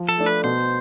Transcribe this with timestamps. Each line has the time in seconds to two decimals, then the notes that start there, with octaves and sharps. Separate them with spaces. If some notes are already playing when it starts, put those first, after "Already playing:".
Already playing: F3
0.09 A4
0.18 A3 D4
0.26 B4
0.44 B2 C5